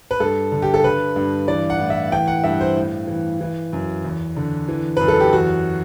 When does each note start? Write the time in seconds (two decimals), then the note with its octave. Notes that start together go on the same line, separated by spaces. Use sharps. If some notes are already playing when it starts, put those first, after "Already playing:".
0.11 B4
0.20 G2 A4
0.52 D3
0.62 G4
0.74 A4
0.84 D3 B4
1.16 G2
1.48 E3 D5
1.70 F#5
1.80 A2
1.90 E5
2.12 E3 G5
2.27 F#5
2.44 G2 E5
2.61 C5
2.76 A2
3.08 E3
3.41 E3
3.73 F#2
4.04 E2
4.37 D3
4.68 E3
4.97 F#2 B4
5.08 A4
5.20 G4
5.33 E2 F#4